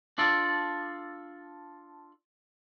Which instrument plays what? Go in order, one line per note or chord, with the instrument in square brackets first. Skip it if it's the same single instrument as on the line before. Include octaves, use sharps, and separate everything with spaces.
[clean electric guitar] D4 F4 A4 D5